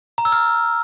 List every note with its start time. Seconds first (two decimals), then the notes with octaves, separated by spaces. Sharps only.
0.18 A#5
0.25 E6
0.32 F6